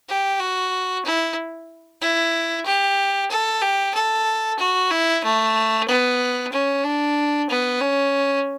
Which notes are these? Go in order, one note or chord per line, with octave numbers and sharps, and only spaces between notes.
G4
F#4
E4
E4
G4
A4
G4
A4
F#4
E4
A3
B3
C#4
D4
B3
C#4